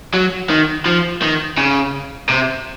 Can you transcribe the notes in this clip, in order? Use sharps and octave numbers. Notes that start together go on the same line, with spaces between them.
F#3
D#3
F3
D#3
C#3
C3